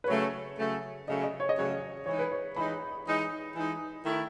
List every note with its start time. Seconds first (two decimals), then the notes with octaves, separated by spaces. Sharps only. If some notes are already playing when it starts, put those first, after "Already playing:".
0.04 B4
0.08 C#3 F#3 A3 C#5
0.58 C#3 F#3 A3
1.08 C#3 F#3 A3 D#5
1.24 D#5
1.40 C#5
1.49 D#5
1.56 C#3 F#3 A3 C#5
2.06 E3 G#3 D#4 C#5
2.19 B4
2.31 C#5
2.56 E3 G#3 D#4 B5
3.05 E3 G#3 D#4
3.55 E3 G#3 D#4
4.05 D#3 A3 E4